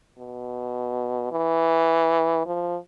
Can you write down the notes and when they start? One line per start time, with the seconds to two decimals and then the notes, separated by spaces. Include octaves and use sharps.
0.18 B2
1.32 E3
2.46 F3